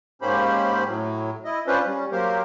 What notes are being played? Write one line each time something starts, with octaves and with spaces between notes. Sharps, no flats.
G#2 A#3 C#4 G4 C5 B5
A2 F#3
E4 D#5
C#4 D4 F4 B4 C5
G3 C#4
F#3 A#3 G4 A#4 C5